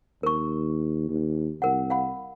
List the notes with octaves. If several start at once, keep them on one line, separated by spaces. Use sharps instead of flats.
D#2 A#4 C#6
D#2
C2 A#4 F#5
F5 F#5 B5